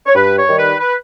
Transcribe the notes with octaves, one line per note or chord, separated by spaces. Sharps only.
C#5
G2 B4
C#5
D#3 G3
B4
B4